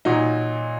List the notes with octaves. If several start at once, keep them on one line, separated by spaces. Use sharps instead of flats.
A#2 F#3 D#4